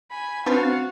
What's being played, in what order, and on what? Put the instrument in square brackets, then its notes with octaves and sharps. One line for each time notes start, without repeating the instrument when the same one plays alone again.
[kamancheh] G#5 B5
[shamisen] F3 D4 B4 [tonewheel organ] C4 A6 [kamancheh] F#4 F5